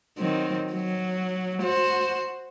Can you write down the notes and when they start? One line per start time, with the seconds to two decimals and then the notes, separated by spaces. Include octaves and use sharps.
0.18 D#3 F#3 C4
0.73 F#3
1.62 F#4 C5